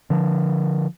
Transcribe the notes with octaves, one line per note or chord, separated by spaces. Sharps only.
D3 F3